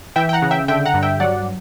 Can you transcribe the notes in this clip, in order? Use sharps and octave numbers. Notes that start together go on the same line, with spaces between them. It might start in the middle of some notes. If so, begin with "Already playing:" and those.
E3 E5 G5
G5
F#5 A#5
C#3
E5 G5
D3 E5 G5
F#5 A#5
G2
E5 G5
F#3 D5 F#5